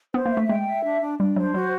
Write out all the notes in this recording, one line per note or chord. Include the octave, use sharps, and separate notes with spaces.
B3 C5
A#3
E5
A3
G#3 G5
E5
D4
D4
G3 D4
F#3 C5
F#3 F#4